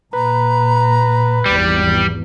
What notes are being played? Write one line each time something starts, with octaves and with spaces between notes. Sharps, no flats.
A#2 B4 A#5
G#1 E2 G3